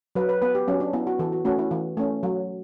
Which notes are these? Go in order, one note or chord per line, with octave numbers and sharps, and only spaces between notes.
F#3 B4
B4
B3 B4
G4
F#3 C#4
D4
B3 E4
F#4
E3 A4
F#4
A3 C#4 F#4
E4
E3
A3 C#4
F#3